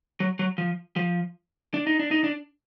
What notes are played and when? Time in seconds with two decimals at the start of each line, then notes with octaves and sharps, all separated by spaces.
0.20 F#3
0.39 F#3
0.58 F3
0.96 F3
1.74 D4
1.87 D#4
1.99 D4
2.11 D#4
2.24 D4